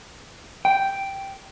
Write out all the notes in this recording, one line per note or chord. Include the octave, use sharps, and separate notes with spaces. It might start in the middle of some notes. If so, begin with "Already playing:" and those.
G5